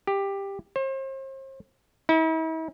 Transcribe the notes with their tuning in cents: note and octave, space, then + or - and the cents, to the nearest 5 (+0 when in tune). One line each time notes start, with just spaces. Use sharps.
G4 +10
C5 +40
E4 -45